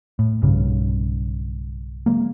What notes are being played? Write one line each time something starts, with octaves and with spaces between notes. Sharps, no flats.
A2
B1 G2 C#3
C#3 F#3 G#3 A#3